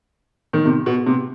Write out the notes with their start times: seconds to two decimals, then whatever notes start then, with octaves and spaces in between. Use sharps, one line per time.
0.53 D#3
0.65 C3
0.86 B2
1.06 C3